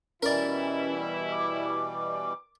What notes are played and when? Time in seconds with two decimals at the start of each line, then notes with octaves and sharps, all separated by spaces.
0.23 B2 E3 G3 C#4 E4 A#4 D5
1.32 D6